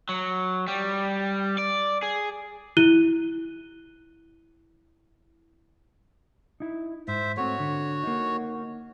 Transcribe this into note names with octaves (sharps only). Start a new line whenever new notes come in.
F#3
G3
D5
G#4
E4 F#6 D#7 G7
D#4 E4
G#2 C5 E5
A3 C4 F#4 C#5
D3
A#3 D#4